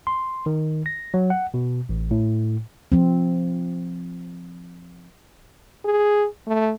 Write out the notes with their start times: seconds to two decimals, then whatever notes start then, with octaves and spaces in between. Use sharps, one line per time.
0.07 C6
0.46 D#3
0.86 A#6
1.14 F#3
1.30 F#5
1.54 B2
1.89 A1
2.11 A2
2.92 F3 C4
5.85 G#4
6.47 A3